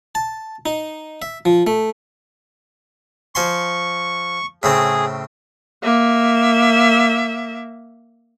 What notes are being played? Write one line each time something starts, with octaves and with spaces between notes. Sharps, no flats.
A5
D#4
E5
F3
A3
F3 G#5 C6 C#6
A2 C#3 C4 G#4
A#3 E5